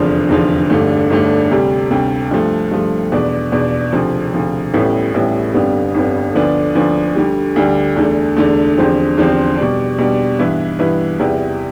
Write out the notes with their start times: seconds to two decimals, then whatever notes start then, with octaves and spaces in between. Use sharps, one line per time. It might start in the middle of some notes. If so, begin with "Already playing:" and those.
Already playing: F1 E2 D3 F3
0.29 F1 E2 D3 F3
0.70 G1 G2 D3 A3 D4
1.10 G1 G2 D3 A3 D4
1.50 D2 C3 G3
1.91 D2 C3 G3
2.31 G2 F3 A3
2.71 G2 F3 A3
3.12 E2 B2 B3 D4
3.52 E2 B2 B3 D4
3.92 D2 C3 F3
4.33 D2 C3 F3
4.74 A1 A2 G3 B3 E4
5.14 A1 A2 G3 B3 E4
5.54 G1 F2 D3 G3 B3
5.94 G1 F2 D3 G3 B3
6.35 D2 D3 F3 B3 D4
6.75 D2 D3 F3 B3 D4
7.16 D2 D3 G3
7.56 D2 D3 G3
7.96 E2 D3 A3
8.37 E2 D3 A3
8.77 E2 D3 F3 C4 G4
9.18 E2 D3 F3 C4 G4
9.57 B2 G3 D4
9.98 B2 G3 D4
10.39 G2 E3 B3 E4 B4
10.79 G2 E3 B3 E4 B4
11.19 E2 C3 G3 B3 E4